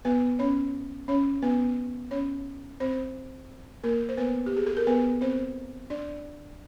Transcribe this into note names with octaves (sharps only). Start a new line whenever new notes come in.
B3 B4
C#4 C#5
C#4 C#5
B3 B4
C#4 C#5
C4 C5
A#3 A#4
C5
B3 B4
G4
G#4
A4
A#4
B3 B4
C4 C5
D4 D5